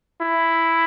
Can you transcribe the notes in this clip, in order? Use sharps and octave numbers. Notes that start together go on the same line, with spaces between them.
E4